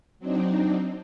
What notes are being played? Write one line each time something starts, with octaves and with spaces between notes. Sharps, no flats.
F#3 C4 D4 D#4